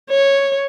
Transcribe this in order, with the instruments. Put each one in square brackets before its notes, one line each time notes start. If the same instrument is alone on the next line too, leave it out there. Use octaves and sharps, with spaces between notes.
[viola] C#5